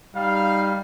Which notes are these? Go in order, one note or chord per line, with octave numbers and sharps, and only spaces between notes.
G3 D#4 F5